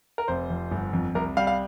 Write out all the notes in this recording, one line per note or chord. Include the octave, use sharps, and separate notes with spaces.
A#4
F1 C5
F2
G1
F2
C2 A#4
G3 F5
F5